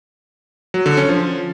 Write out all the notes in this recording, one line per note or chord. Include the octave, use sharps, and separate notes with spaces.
F#3
D3
C#4
F3